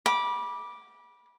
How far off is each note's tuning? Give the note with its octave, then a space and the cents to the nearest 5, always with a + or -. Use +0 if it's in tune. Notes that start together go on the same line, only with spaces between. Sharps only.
B5 -25 D6 +0